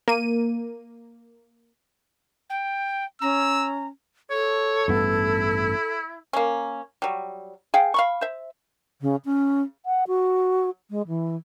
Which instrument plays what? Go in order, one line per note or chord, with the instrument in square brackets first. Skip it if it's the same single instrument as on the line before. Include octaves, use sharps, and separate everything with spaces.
[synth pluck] A#3 D#7
[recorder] G5
[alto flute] C#4 [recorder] A#5 [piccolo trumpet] E6
[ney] A4 [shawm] C#5
[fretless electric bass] A1 G2 B3 [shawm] E4
[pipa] A#3 C#4
F#3 G3
G#4 F5 G5
F5 B5 C#6
C5 E5
[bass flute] C#3
C#4
F#5
F#4
G#3
E3